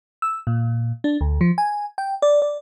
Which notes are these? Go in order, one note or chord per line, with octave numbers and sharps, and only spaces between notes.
E6
A#2
D4
D2
F3
G#5
G5
D5
D5